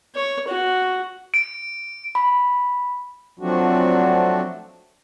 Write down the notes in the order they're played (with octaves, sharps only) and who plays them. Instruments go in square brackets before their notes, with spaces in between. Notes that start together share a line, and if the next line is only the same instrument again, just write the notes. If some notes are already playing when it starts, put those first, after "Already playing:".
[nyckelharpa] C#5
F#4
[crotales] D7
[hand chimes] B5
[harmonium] F3 F#3 A3 C4 D4 F#4